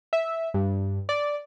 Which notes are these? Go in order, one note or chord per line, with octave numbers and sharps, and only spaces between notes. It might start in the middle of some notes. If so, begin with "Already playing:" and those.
E5
G2
D5